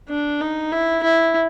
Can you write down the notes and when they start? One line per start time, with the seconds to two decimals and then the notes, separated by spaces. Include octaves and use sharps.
0.09 D4
0.41 D#4
0.72 E4
1.03 E4